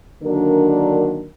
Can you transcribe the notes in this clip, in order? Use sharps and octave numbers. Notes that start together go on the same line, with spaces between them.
D3 D#3 F#3 A#3 D4 A#4